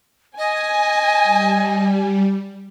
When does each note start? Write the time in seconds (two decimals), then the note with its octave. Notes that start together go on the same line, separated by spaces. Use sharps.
0.38 D#5 G#5
1.24 G3